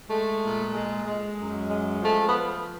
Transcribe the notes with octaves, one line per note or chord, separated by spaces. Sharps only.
G#3 A3
A#2
G#3
G#3
F#2
G#3
F3 A3
B3